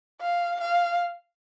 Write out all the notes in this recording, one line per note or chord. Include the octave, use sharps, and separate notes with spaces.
F5
F5